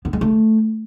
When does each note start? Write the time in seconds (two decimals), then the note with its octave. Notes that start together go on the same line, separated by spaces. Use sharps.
0.05 B3
0.13 G#3
0.21 A3